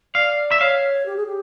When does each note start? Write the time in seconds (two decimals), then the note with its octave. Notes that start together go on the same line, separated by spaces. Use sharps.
0.15 D5 F5
0.51 E5
0.60 C#5 F5
1.06 G4
1.16 G#4
1.26 G4